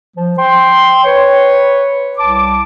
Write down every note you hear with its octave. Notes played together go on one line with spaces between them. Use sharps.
F3
G5 C6
B4 C#5
C2 A5 D6